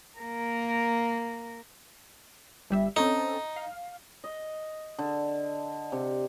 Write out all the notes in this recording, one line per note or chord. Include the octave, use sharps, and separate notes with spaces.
A#3 A#4
G1 G3 E5
C4 C#4 D#4 A4
F5
D#5
D3
C3